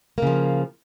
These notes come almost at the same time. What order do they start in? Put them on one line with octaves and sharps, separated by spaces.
A#3 C#3 F3